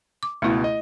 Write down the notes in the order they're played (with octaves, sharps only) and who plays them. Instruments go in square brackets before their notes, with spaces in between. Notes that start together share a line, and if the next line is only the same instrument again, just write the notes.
[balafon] D6
[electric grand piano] C#2 B2 [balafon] A3 E4
[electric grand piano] D#5